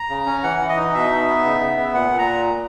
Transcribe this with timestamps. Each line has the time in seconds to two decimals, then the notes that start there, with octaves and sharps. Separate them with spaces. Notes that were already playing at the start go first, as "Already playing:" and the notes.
Already playing: A#5
0.09 C#3
0.26 C#4
0.43 E3 F#5
0.61 E3
0.69 D#5
0.77 D#4
0.94 B2 E5
1.10 D#4
1.28 B3
1.44 C#3
1.60 C#3
1.77 B3
1.94 A#2 F#5
2.11 A#2
2.19 A#5